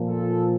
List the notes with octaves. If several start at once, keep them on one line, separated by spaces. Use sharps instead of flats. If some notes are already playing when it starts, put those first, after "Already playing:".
Already playing: A#2 F3
A4